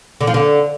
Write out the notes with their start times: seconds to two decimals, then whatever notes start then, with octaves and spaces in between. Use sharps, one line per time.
0.21 D3
0.27 F3
0.34 D3